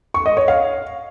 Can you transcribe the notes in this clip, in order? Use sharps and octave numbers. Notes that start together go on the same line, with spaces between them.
C#6
D#5
C#5
F5